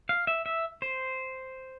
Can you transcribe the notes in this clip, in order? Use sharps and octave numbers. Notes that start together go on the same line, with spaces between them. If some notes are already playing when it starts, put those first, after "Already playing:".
F5
E5
E5
C5